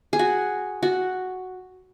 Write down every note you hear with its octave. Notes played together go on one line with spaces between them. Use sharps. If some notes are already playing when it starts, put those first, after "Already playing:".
G#4
F#4
F#4